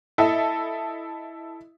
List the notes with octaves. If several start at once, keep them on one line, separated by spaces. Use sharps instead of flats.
E4 A4 D#5 E5